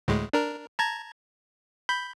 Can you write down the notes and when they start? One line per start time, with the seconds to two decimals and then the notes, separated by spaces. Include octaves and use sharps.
0.08 D2 A2 G#3
0.33 D4 A#4
0.79 A5 A#5 G#6
1.89 B5 G6